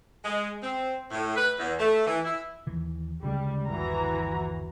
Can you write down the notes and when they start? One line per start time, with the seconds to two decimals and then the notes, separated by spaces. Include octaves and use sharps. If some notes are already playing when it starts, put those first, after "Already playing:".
0.25 G#3
0.63 C4
1.11 A2
1.36 B4
1.59 E2
1.79 A3
2.07 E3
2.25 E4
2.67 D#2 E3
3.23 D2 C#3 G3 G#3
3.67 G1 D#2 E3 F#4 A#5